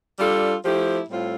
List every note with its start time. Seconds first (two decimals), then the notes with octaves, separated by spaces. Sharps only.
0.18 G3 D4 F4 A4
0.64 F3 A3 E4 G4
1.09 A2 G3 C4 F4 A4